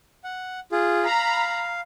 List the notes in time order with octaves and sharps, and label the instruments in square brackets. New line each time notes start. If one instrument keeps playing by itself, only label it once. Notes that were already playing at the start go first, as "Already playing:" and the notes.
[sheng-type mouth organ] F#5
F4 G#4
[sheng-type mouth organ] F5 [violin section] A#5 B5